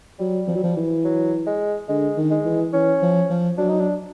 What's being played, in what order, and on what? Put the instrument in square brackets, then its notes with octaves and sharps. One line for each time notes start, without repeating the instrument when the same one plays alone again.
[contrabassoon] F#3 [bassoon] G3
[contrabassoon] F3
F#3
F3
E3
[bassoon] F#3
G#3
[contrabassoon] D3 [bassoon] G#3
[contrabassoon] D#3
[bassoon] G#3
[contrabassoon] E3
[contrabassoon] E3 [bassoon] C#4
[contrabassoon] F3
F3
[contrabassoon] F#3 [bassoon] D4
[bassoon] D#4
D4